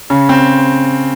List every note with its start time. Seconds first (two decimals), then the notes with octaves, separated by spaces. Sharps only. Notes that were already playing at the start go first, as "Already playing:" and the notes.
0.10 C#3
0.29 C4